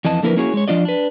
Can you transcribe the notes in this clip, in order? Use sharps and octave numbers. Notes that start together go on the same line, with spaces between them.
F2 E3 D#5 A5
D3 F3 A#3 E4 A#4 B4
A#3 C#4 E4 F#4 G#4 C#5
G#3 C#5
F3 D4 F4 D5 D#5
D4 B4